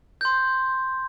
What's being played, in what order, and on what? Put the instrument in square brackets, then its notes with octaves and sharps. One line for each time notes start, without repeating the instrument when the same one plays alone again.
[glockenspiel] C6 G6